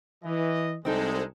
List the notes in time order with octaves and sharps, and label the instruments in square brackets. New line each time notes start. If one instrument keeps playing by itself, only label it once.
[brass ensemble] E3 D#5
[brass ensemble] C2 G#3 [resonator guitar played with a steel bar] C4 D#4 A4